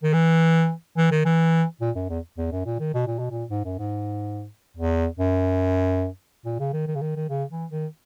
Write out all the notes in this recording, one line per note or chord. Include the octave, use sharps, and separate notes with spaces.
D#3
E3
E3
D#3
E3
A#2
F#2
E2
E2
F#2
A#2
D#3
B2
A#2
B2
A#2
G#2
F#2
G#2
E2
F#2
A#2
C#3
D#3
D#3
C#3
D#3
D#3
C#3
E3
D#3